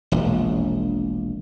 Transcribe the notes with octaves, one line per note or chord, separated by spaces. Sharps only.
E1 A#1